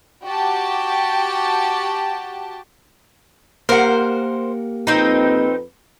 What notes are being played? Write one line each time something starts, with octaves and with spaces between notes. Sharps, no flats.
F#4 G4 G5 A5
A#3 G4 A#4 C5 F#5
F2 C4 D#4 B4